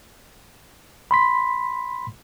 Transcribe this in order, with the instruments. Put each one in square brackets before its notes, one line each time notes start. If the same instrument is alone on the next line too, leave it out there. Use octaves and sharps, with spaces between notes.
[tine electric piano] B5 C6 B6